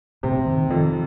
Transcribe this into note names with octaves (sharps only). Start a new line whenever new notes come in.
A2 C3
A#2
A2
D#3
F2 D#3